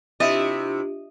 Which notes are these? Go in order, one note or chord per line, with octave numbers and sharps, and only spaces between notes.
C3 D4 E4 F4 G4 D#5 E5